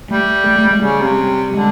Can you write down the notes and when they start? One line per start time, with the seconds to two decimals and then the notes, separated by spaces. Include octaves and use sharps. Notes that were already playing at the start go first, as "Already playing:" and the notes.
0.10 G3 A3
0.46 A3
0.58 A3
0.71 G#3
0.82 C#3 G3
1.00 C3
1.54 D3 G#3